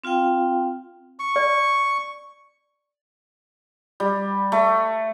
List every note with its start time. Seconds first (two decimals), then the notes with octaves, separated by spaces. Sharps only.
0.04 C4 F4 F5 G5
1.19 C#6
1.36 D5
4.00 G3
4.52 A3